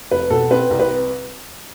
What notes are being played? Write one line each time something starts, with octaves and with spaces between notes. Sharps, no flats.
F1 B4
B2 A4
C4 B4
C2
B4